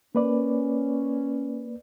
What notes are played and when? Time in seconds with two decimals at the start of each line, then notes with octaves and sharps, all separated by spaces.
0.15 A#3 C#4 B4 D5